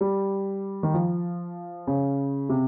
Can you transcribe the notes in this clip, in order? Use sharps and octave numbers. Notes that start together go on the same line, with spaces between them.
G3
D#3
F3
C#3
C3